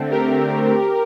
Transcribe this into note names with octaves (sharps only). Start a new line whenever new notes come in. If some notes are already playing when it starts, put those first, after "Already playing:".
Already playing: D3 A3 C4
G4 A#4